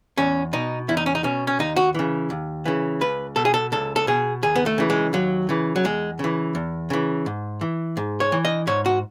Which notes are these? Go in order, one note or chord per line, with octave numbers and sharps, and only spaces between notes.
E2 C#4
B2 D#4
E2 E4
D#4
C#4
D#4
B2 C#4
C#4
D#2 D#4
F#4
C#3 E3
D#2
C#3 E3
C#2 B4
B2 A4
G#4
A4
C#2 A4
A4
B2 G#4
D#2 G#4
B3
A3
C#3 E3
G#3
D#2 F#3
C#3 E3
F#3
E2 G#3
C#3 E3
E2
C#3 E3
G#2
E3
G#2
C#5
E3
D#5
G#2 C#5
F#4